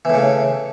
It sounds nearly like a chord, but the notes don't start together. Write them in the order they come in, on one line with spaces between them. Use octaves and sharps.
E3 A2 C#3